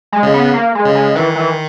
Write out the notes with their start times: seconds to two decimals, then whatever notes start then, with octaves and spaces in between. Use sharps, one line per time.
0.12 G#3
0.23 C#3
0.34 B3
0.54 A#3
0.75 G#3
0.85 C#3
0.95 G#3
1.15 D#3 E3
1.36 E3